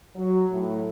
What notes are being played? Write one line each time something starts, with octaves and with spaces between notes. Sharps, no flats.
F#3
A2